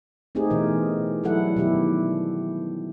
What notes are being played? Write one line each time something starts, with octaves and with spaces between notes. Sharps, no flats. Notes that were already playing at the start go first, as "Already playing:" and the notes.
A3 C4 D#4 G4 G#4
B2 E3 A#4
F#3 G3 E4 A4 F#5
B2 D#3 E4 G4